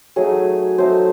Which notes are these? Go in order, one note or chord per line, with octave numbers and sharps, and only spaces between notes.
F#3 A3 D#4 G#4
F#3 A3 D#4 C5